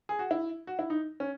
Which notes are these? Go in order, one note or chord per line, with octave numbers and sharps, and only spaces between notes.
G#4
F#4
E4
F#4
E4
D#4
C#4